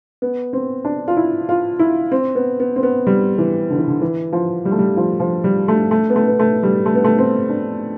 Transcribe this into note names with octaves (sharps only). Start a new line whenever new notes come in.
B3
C4
D4
F4
E4
F4
E4
C4
B3
B3
C4
B3
G3
E3
D3
E3
D3
E3
F3
G3
A3
G3
F3
F3
G3
A3
A3
B3
A3
B3
A3
G3
A3
B3
A3
C4
D4